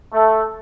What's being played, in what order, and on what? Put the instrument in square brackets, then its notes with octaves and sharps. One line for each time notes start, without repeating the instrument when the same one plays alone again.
[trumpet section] A3